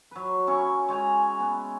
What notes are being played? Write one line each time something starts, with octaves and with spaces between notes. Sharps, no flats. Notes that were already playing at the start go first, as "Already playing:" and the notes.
F#3 B4
C#4 E4 A#4 C#6
G#3 C#5 G#5 A#5
B3